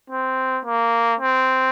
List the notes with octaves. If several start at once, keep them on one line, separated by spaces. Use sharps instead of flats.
C4
A#3
C4